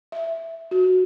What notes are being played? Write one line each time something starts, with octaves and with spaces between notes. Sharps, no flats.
E5
F#4